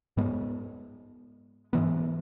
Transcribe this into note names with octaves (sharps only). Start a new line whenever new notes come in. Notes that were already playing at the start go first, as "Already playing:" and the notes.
G#2 G#3 B3
G#2 E3 B3